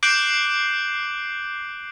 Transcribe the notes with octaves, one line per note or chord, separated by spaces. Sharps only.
D6 F#6 G6 C7 D7 F#7